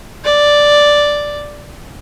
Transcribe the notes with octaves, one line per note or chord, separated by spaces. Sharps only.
D5